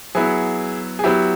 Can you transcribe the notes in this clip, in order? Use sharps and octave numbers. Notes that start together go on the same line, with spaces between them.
F#3 B3 E4 G#4
G#4
F#3 B3 E4 G4